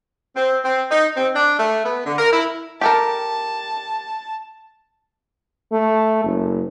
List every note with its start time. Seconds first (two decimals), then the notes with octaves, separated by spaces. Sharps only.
0.36 C4
0.65 C4
0.91 D#4
1.17 C4
1.35 D4
1.59 A3
1.85 B3
2.06 D3
2.18 A#4
2.33 E4
2.81 G4 A4 A#4 A5
5.72 A3
6.24 F#1